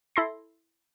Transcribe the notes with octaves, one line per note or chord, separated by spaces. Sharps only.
E4 A4 C6 A#6 C7